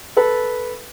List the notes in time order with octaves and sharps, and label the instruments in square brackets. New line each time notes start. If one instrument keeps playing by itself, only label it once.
[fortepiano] A4 B4